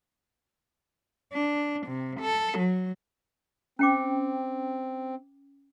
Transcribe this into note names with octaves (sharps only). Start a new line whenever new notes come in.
D4
C3
A4
F#3
C4 C#4 G5 D6